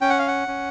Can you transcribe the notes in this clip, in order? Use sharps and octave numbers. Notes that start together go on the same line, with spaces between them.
C#4 G5
F#5
F5
F#5
C#4